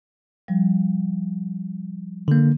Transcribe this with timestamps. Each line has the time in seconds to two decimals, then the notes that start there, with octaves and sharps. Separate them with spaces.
0.48 F3 G3
2.28 D3 A#3